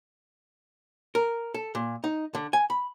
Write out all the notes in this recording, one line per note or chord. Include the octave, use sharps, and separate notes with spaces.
A#4
A4
A#2
D#4
D3
G#5
B5